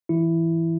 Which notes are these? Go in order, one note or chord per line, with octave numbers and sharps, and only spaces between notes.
E3 E4